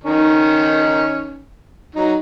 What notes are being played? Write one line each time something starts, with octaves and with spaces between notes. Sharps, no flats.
D#3 C#4 D#4
F#3 D#4